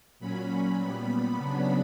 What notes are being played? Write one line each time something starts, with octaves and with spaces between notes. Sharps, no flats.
A#2 F#3 C#4 B5
A#2 G3 B3 B5
C#3 F#3 B3 D4 B5